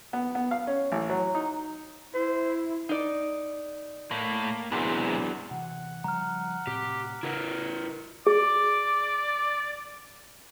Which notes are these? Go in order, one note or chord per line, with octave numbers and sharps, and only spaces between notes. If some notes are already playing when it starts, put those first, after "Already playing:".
B3
B3
F5
C#4
A1
F#3
D#4
E4 C5
D#4 D5
A2 A#3
E2 G#2 C3 F#3 D4
C3 E3 F#5
C#3 F3 G3 A#5 F6
A2 C3 C4 G4
C#3 E4 A#4 B4
G#4 D5 D6